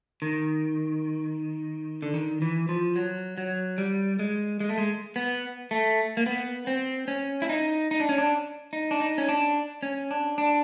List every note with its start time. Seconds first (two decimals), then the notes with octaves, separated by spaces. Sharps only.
0.22 D#3
2.02 D3
2.14 D#3
2.42 E3
2.69 F3
2.96 F#3
3.38 F#3
3.78 G3
4.19 G#3
4.60 G#3
4.69 A3
4.78 G#3
5.16 B3
5.71 A3
6.17 A#3
6.26 B3
6.67 C4
7.08 C#4
7.42 E4
7.49 D#4
7.91 D#4
8.00 D4
8.09 C#4
8.18 D4
8.73 D#4
8.91 D4
9.00 D#4
9.18 C#4
9.29 D4
9.83 C#4
10.11 D4
10.38 D4